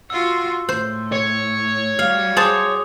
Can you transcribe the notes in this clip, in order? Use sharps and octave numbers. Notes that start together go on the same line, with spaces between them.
F4 F#4 E6
A2 C5
C#5
G3 F#4 F5
G#4 C5 A5 D6 D#6 F7